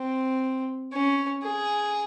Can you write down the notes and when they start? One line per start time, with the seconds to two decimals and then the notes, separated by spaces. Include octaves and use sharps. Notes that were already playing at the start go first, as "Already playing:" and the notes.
Already playing: C4
0.92 C#4
1.43 G#4